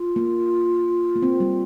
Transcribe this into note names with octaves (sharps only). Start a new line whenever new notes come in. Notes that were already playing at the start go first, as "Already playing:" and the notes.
Already playing: F4
A#3
A#3
C4
G3